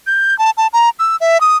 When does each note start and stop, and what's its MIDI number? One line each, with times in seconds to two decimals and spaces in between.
0.07 0.37 91
0.39 0.51 81
0.57 0.67 81
0.73 0.90 82
0.99 1.16 88
1.21 1.40 76
1.41 1.57 87